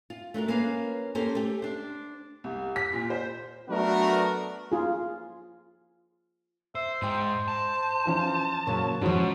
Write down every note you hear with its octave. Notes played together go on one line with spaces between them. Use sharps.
F4
A3 D4 F#4 A#4
A#3 C#4 F4 B4 F5
A#3 C#4 G4 A4 A#4 C5
A3 G4
D4 C5
C2
B6
A#2
C5
F#3 A3 B3 D4 F#4 A#4
F4 G#4
C5 E5
G#2 C5 D#5 G5
A5
E3 F3 C#4
A#2 C#3 F#3 A#3 C#5
G#2 F3 C#4 E4 F#4 C5 C#5